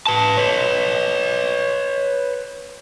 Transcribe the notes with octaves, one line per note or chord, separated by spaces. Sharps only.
B4 A5
B4 C#5